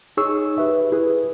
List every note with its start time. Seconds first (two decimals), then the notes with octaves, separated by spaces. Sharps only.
0.17 D#4 G#4 C#5 C#6 E6
0.58 G4 B4 E5
0.92 E4 G#4 B4